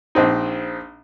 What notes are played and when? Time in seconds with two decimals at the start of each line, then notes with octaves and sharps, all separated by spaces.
0.15 A#1 C4 D#4